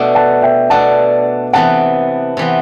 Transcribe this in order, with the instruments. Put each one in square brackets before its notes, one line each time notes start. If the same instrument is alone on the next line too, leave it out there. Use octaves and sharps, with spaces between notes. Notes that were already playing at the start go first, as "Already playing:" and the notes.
Already playing: [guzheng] B2 A3 D4
[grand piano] F#5 A5
E5 G5
[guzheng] B2 A3 D4 [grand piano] F#5 A5
[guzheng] C3 E3 B3 [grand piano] F#5 A5
[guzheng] C3 E3 B3